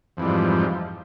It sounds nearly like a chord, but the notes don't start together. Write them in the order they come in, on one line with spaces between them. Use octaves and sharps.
F2 E3 G3 G#2 F3